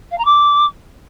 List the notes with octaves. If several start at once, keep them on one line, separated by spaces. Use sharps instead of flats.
F5
A#5
D6